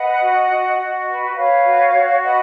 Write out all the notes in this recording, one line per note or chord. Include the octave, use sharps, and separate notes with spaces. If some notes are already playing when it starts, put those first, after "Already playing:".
Already playing: B4 D#5 F#5
F#4
F#4
F#4
B4
B4 C#5 F5
F#4
F#4
B4 D#5 F#5